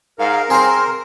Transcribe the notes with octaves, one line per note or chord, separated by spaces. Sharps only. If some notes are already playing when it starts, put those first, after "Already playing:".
G#2 A#4 F5
C4 G#4 C5 C6